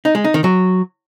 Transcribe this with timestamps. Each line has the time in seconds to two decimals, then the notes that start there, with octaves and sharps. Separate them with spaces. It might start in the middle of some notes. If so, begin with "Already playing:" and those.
0.05 D#4
0.15 G#3
0.24 D#4
0.34 D#3
0.44 F#3